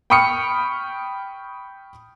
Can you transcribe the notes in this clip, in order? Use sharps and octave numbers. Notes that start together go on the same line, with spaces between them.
G5 B5 C#6 D#6 F6 C#7